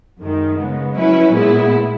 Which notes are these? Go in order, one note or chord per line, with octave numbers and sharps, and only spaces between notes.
F#2 D#3 G#3
C#3 G#3 B3
F#3 C#4 E4 B4
A#2 G#3 B3 E4